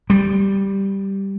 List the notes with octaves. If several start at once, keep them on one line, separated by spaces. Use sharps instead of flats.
G3